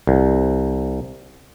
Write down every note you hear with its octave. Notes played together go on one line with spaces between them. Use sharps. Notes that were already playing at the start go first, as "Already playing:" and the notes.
C2